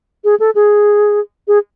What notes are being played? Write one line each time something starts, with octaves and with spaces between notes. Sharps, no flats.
G#4
A4
G#4
G#4